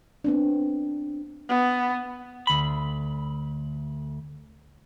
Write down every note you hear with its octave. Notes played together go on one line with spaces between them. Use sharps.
B3 C4 D4
B3
D2 B5